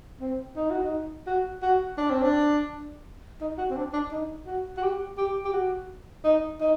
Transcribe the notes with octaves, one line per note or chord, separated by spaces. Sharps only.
C4
D#4
F#4
D#4
F#4
F#4
D4
C4
D4
D#4
F#4
C4
D4
D4
D#4
F#4
F#4
G4
G4
G4
F#4
D#4
D#4